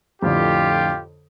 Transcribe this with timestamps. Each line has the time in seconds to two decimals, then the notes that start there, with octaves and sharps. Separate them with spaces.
0.22 F2 A2 D3 F4 G4